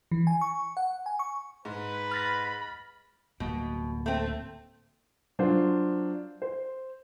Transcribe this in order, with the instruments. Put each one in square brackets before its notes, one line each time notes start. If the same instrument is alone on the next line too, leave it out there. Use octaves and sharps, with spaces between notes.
[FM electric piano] E3
G#5
C#6
F#5
G#5
C#6
[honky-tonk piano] G#2 [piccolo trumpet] B4
[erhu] B5 [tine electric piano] F6 A6 A#6
[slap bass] D1 G3 A#3 [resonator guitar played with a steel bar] B2
[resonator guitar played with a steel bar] A3 C4
[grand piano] F#3 D4 F4 C5
C5